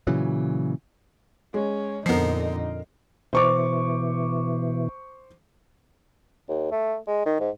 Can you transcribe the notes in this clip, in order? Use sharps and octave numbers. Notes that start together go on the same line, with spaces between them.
A#2 C#3 E3 F#3
G#3 C#4
F2 A#2 D3 F3 B3 D#4 A#4 C7
B2 E3 C5 C#6 D6
D#2
A3
G#3
D#3
G#2